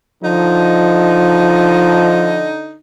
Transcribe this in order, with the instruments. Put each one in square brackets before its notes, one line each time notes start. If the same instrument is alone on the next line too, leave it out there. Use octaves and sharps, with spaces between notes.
[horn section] D3 D#4 [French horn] F3